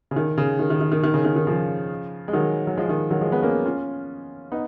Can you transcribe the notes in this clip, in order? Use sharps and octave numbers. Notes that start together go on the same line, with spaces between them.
C#3
D#3
C#3
D#3
D#3
D#3
D#3
D#3
C#3
D#3
D#3
C#3 F3
G#3
D#3 F#3
F#3
F3 G#3
D#3
D#3 F#3
F3 G#3
G#3 B3
A#3 C#4
C#4 F4
B3 D#4